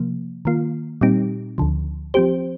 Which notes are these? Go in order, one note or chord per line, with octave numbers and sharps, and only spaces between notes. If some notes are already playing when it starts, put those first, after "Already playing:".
Already playing: C3 F3 A#3
D#3 A#3 F4
A#2 G3 C4 D#4 G4
D2 D3 F3
F3 C4 G4 C5